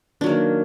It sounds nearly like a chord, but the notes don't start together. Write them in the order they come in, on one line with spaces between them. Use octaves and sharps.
D4 F#3 A#3 D#3